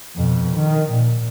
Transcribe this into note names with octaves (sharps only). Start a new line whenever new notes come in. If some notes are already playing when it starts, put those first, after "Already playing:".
F2 B2
D#3
A#2